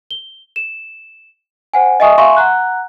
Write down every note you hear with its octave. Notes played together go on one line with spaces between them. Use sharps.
G7
E7
C5 F#5 G#5
D#5 E5 G#5 C#6 D#6
E5 F5 G#5 C6 C#6
F#5 A#5 F#6